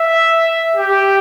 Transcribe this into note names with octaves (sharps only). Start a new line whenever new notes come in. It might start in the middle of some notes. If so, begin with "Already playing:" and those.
Already playing: E5
G4